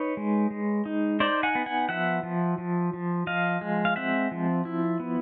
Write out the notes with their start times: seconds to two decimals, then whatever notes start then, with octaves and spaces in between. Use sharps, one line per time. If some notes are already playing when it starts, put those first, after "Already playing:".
Already playing: D#4 B4 C#5
0.17 G#3
0.51 G#3
0.86 D#4
1.20 D#4 C5 D5
1.43 F#5 G#5
1.55 B3
1.66 F#5 G#5
1.89 F3 E5 F#5
2.23 F3
2.58 F3
2.93 F3
3.27 F3 D#5 F5
3.61 G#3
3.85 F5
3.96 C4 E5 F#5
4.31 F3
4.65 E4
5.00 B3